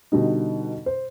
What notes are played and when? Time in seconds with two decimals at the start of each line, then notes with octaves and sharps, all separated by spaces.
0.12 B2 D3 G3 D#4
0.86 C5